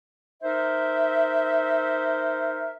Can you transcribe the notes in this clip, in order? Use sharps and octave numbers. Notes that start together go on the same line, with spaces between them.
D#4 A#4 C5 E5